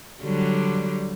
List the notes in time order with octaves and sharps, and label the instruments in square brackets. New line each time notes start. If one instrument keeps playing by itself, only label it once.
[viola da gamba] D3 F#3 G3